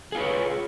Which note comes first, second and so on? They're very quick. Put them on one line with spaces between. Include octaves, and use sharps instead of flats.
G#4 F4 B4 C#5